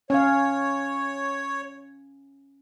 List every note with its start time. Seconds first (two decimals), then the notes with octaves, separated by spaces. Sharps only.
0.10 C#4 C#5 F5